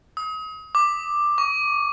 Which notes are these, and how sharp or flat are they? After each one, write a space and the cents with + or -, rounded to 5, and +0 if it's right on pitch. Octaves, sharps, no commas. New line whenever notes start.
D#6 +35
D6 +10
C#6 +40